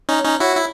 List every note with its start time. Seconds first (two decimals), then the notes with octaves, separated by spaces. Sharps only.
0.09 C#4 D#4
0.17 C#5
0.24 C#4 D#4
0.40 E4 F#4 C#5
0.56 E4